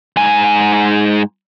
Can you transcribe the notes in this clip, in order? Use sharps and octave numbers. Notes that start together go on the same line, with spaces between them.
G#2 G#5